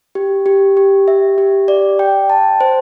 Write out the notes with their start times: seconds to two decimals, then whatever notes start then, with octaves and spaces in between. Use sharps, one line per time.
0.15 G4
0.46 G4
0.77 G4
1.08 E5
1.38 G4
1.68 D5
1.99 G5
2.30 A5
2.61 C5